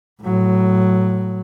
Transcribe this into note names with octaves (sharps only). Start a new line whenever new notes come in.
A2 F#3